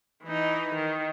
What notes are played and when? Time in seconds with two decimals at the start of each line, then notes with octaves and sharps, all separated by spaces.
0.24 E3 D#4
0.74 D#3